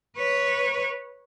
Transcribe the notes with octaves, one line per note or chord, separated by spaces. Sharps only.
B4 C#5